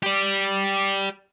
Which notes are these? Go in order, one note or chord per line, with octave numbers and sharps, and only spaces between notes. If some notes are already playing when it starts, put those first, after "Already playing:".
G4 D5